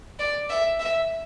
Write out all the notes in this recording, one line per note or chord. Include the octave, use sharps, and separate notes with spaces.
D5
E5
E5